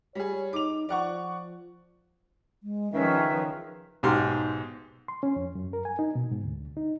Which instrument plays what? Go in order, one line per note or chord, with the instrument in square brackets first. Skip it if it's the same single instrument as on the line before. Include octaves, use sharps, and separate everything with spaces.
[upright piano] G3 G#4 [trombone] C#5
[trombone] D#4 [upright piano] D6 F7
[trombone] F3 [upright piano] D5 F#5 C#6
[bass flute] G#3
[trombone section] C#2 D#3 [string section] F3 [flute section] C#4 E5 [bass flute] B4
[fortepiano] B1 G#2 G4 C6 F6
[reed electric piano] C6
C#4
F2
F#2
A#4
G#5
D#4
B2
G#2
D2
D#4